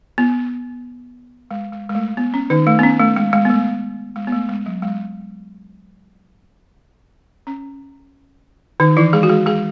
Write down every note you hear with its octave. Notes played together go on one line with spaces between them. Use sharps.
B3
G#3
G#3
G#3
A3
B3
C#4
D#3 D#4
A3
B3
C#4
A3
G#3
G#3
B3
A3
G#3
B3
A3
G#3
F#3
G#3
C#4
D#3 D#4
E3 E4
G#3 G#4
F#4
G#3 G#4
G#3 G#4